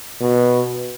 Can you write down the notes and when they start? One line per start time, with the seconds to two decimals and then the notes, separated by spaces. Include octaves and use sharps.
0.21 B2